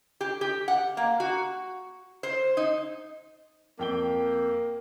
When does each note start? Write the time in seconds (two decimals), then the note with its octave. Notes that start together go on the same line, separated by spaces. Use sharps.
0.21 G4
0.41 G4
0.68 F#5
0.97 A#3
1.20 F#4
2.23 C5
2.57 D#4
3.79 F2 A#3 G5 G7